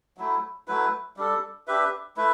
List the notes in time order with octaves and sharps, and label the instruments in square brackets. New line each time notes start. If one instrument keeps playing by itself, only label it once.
[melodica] F#3 A3 E4
F#3 A3 E4 B4
G3 D4 A4
D4 G4 B4 E5
A3 E4 B4 E5